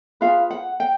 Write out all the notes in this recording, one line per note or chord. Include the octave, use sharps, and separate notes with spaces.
F4 G#4 B4 F5
F#5
G5